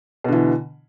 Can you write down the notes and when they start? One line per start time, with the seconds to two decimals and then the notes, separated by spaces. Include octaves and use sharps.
0.24 B2
0.28 D3
0.32 E3